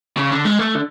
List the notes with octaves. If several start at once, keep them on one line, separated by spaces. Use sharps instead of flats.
C#3
D3
G#3
A3
D3